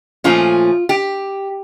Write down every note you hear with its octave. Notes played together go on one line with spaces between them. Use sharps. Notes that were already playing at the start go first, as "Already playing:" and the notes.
A#2 F3 A3 C#4 F4
G4